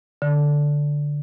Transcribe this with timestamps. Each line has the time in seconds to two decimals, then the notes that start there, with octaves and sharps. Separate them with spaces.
0.22 D3